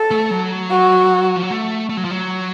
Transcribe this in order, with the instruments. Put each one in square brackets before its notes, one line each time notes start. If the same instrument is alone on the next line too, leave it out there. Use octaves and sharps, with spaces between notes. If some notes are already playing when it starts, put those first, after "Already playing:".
Already playing: [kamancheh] A4
[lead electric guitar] A3
F#3
[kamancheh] F#4
[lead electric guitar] F3
F#3
A3
A3
F#3
F3
F#3